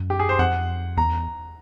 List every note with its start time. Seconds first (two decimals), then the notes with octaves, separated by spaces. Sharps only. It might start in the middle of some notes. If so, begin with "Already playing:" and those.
Already playing: F#2
0.10 G4
0.19 G#4
0.29 C5
0.39 F2 F#5
0.97 E2 A#5